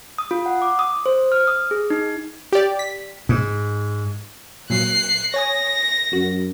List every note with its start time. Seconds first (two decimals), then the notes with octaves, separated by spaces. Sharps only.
0.18 D#6
0.31 F4
0.46 F#5
0.62 D6
0.79 D#6
1.06 C5
1.32 F6
1.47 D#6
1.71 G#4
1.90 D#4
2.52 G4 D5
2.79 B6
3.29 G#2
4.70 A#2 F#3 F#6 C7
5.34 C#5 G#5 D#6 A#6
6.13 F#2 F#4